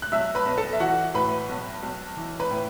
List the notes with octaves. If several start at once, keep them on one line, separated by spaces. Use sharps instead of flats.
F#6
B1 E5 E6
B4 B5
B1
A4 A5
E5
E3 F#4 F#5
A2 B4 B5
B1
B1
E3
B4 B5
A2